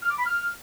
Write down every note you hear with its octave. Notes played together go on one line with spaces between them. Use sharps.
F6
D6
B5
F6